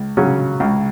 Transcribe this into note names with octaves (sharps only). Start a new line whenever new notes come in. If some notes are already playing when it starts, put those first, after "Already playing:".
Already playing: C#2
C#3 F#3 C#4
C#2